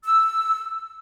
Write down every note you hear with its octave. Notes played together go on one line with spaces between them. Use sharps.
E6